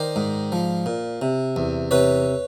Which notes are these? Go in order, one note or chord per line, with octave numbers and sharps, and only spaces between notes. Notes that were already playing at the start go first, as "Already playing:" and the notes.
Already playing: D#3 C5 D5
G#2
F3
A#2
C3
E2
C3 B4 C#5